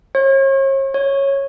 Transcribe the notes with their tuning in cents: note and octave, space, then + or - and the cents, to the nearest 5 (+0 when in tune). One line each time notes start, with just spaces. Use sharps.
C#5 -40
C#5 -10